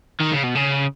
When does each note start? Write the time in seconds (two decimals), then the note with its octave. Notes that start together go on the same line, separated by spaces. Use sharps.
0.20 D#3
0.32 C#3
0.44 B2
0.55 C#3